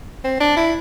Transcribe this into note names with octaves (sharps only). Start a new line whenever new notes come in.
C4
D4
E4